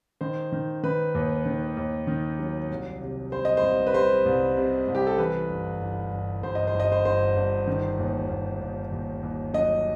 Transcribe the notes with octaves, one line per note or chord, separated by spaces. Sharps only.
D#3 C5
D#3
D#3 B4
D#2
D#3
D#2
D#3
F#3
C2
C3
G3 C5
D#5
C5
C2
B4
G3 C5
C2
C3
C2
G4
A4
E3 B4
G1
G1
G1
G1 C5
D#5
C5
G1
D#5
C5
G1 C5
G1
D#3
D#2
D#2
D#2
D#2
D#2
F#3 D#5